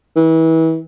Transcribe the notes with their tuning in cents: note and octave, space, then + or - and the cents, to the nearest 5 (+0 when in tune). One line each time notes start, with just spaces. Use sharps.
E3 -30